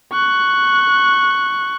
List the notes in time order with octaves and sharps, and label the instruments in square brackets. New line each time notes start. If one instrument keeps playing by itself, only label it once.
[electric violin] C#6 F#6